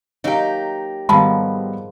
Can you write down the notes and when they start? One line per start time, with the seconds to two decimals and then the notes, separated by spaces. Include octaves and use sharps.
0.24 F#3 A#3 D#4 G4
1.09 G#2 D#3 F3 G3 B3 A5 B5